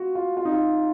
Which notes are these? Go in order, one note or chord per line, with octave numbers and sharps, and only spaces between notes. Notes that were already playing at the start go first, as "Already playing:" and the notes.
Already playing: F4 F#4
F4
F4
D#4
F4